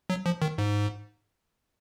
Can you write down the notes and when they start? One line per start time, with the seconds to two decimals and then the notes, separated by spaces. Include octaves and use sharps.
0.10 F#3
0.26 F3
0.42 D#3
0.58 G#2